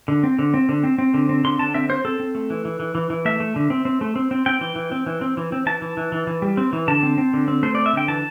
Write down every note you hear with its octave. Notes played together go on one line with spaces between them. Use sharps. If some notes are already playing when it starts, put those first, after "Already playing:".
D3
C4
D3
C4
D3
C4
C4
D3
C4
D3 C6
D3 A5
C4 E5
C4 C5
C4 A4
C4
A3
E3
E3
E3
E3
E3
A3 E5
A3
D3
C4
C4
A3
C4
C4
C4 G5
E3
E3
C4
E3
C4
E3
C4
E3 A5
E3
E3
E3
E3
G3
C4
E3
D3 A5
C4
C4
D3
C4
A3 C5
C4 D5
E5
D3 G5
E3 A5